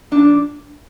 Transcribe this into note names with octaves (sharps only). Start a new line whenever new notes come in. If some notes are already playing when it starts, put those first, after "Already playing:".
A#2 F3 D4